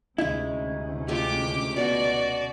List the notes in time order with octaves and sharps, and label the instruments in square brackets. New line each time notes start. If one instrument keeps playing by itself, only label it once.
[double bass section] D2 C3 C#4 [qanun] G#3 D#4 [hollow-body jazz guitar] E4
[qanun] G#3 A3 F4 [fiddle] G4 D6
[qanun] B2 B5 [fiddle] F#4 D5